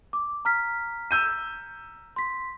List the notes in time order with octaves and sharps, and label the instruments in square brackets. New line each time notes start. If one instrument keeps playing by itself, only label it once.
[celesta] D6
A#5 F6 B6
[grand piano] E6 G6 D#7
[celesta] C6 B6